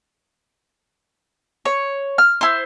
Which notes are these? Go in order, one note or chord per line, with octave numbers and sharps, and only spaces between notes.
C#5
F6
E4 C5